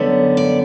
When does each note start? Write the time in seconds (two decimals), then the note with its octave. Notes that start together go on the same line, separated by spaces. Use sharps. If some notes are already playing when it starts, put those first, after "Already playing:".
Already playing: F#2 D3 G3 B3
0.37 D5